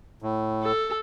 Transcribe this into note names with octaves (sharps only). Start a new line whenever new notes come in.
A2
A4